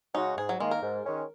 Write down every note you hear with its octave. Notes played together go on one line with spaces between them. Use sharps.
C#3 G#3 C#4 D#4 F#4
G#2 G#4
F#3
D#3 G#3 A#3
A#4
G#2
D#3 G#3 C#4